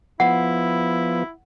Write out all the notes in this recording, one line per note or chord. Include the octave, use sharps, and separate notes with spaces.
F3 B3 E4 F#5